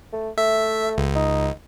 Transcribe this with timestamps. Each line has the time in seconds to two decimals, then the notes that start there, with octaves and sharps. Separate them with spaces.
0.13 A3
0.38 A3 E5
0.98 C#2
1.15 D#4